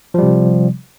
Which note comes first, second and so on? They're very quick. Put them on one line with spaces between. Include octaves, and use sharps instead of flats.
F3 G3 C3